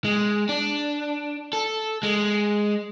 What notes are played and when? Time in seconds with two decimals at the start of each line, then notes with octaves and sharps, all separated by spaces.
0.05 G#3
0.49 D4
1.53 A4
2.03 G#3